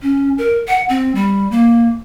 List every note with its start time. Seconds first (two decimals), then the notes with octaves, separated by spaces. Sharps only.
0.02 C#4
0.38 A#4
0.68 F#5
0.89 C4
1.15 G3
1.51 A#3